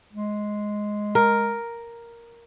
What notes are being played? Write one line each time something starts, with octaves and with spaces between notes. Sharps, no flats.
G#3
A#4